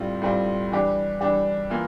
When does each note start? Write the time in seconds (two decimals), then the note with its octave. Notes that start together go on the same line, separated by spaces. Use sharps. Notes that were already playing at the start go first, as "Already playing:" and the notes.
Already playing: A2 G3 C4 F4
0.22 A2 G3 C4 F4
0.72 E3 G3 D4 G4
1.21 E3 G3 D4 G4
1.70 E3 A#3 F4